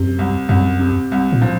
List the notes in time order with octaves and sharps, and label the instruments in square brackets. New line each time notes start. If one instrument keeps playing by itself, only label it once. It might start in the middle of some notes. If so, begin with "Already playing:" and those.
Already playing: [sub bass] F#2 [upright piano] C3
[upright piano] C2
[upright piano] C2 [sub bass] F#2
[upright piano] C3
C2
[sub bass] A#2
[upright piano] F3